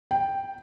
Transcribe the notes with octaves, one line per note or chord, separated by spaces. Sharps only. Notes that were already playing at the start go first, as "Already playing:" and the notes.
G5